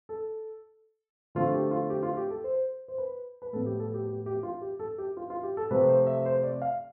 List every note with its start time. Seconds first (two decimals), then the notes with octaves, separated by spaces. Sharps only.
0.09 A4
1.35 D3 F3 A3 C4 F4
1.54 G4
1.71 F4
1.90 G4
2.03 F4
2.17 G4
2.30 A4
2.44 C5
2.88 C5
2.98 B4
3.42 B4
3.53 A2 F3 B3 A4
3.66 G4
3.80 A4
3.94 G4
4.08 G4
4.26 G4
4.43 F4
4.62 G4
4.79 A4
4.98 G4
5.17 F4
5.30 F4
5.43 G4
5.57 A4
5.71 C3 F3 A3 C4 B4
5.88 C5
6.06 E5
6.26 C5
6.43 D5
6.62 F5